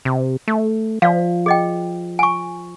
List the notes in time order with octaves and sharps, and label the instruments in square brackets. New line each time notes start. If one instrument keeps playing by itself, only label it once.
[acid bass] C3
A3
[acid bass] F3 [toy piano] D5 F5
[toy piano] G#4 D#5 G5
G#5 C#6